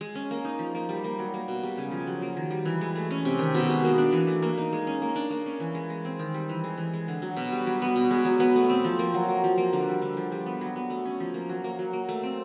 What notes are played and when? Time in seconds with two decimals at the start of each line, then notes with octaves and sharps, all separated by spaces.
0.01 G#3
0.15 C#4
0.31 A#3
0.45 D#4
0.59 F3
0.75 A#3
0.89 G3
1.04 A#3
1.19 F#3
1.34 A#3
1.48 B2
1.63 G3
1.77 C#3
1.92 F3
2.07 F#3
2.22 A#3
2.37 D#3
2.50 G3
2.65 E3
2.81 G#3
2.95 A3
3.11 C#4
3.25 C3
3.39 D#3
3.54 B2
3.69 G#3
3.83 A#3
3.98 D4
4.12 E3
4.27 A3
4.42 A#3
4.58 D#4
4.73 G#3
4.87 C#4
5.02 A#3
5.16 D4
5.30 A#3
5.46 C#4
5.60 E3
5.75 G#3
5.90 G#3
6.05 C4
6.19 D#3
6.34 G3
6.49 E3
6.64 G#3
6.78 E3
6.94 G#3
7.08 D3
7.22 F#3
7.37 B2
7.52 G3
7.67 F#3
7.82 B3
7.96 B2
8.11 G#3
8.25 F#3
8.40 B3
8.55 A3
8.69 C4
8.84 F3
8.99 A#3
9.14 F#3
9.29 A#3
9.44 F3
9.57 A#3
9.73 D3
9.88 G3
10.02 D3
10.17 F3
10.32 G3
10.46 B3
10.61 F#3
10.76 B3
10.90 A3
11.05 C#4
11.20 F3
11.34 A#3
11.49 F#3
11.64 A#3
11.79 F#3
11.93 A#3
12.09 A3
12.23 C4